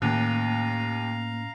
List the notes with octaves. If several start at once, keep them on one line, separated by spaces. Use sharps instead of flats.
D#2 A2 A#3 C#4 F5 A#5 F#6